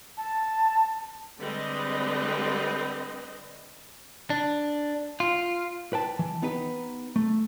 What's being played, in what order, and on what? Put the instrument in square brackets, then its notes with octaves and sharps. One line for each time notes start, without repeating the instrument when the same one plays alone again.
[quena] A5
[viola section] D3 G3 G#3 C4 B4 D#5
[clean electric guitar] D4
F4
[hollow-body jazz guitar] B4 G5 A5
E3
B3 D#4 G4 B4
A3